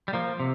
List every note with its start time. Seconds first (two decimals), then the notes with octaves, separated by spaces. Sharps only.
0.08 G3
0.13 F3 A#3
0.40 C3